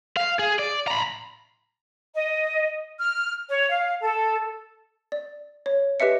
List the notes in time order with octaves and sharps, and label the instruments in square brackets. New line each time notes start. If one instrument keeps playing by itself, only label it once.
[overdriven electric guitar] F5
G#4
D5
A#5 B5
[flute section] D#5
F6
C#5
F5
A4
[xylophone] D5
C#5
G4 B4 D#5 E5 C#7